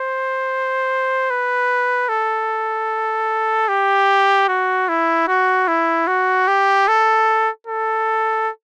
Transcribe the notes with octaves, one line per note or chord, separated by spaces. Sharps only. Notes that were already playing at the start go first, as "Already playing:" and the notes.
Already playing: C5
B4
A4
G4
F#4
E4
F#4
E4
F#4
G4
A4
A4